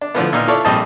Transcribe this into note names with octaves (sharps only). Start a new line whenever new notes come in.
D4
A2 D3 F3 B3
A#2 D#3 D#4 F6
E4 F4 A4 C#5 D5
A#1 G3 C4 D#5 A5